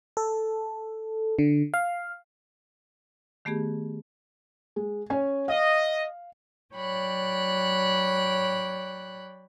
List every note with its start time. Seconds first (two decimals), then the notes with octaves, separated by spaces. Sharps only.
0.17 A4
1.39 D3
1.74 F5
3.45 D#3 A3 B3 G4 G#4
4.76 G#3
5.10 C#4 C#5 G#5
5.48 D#5 F5
6.74 F#3 C#5 D5 G5 B5 F#6